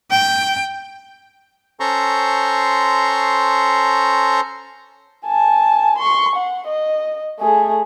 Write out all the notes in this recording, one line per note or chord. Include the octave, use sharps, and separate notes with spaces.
G5
C#4 A4 C5 A#5 C6 C#6
G#5 A5
C6 C#6
F#5
D#5
A3 G#4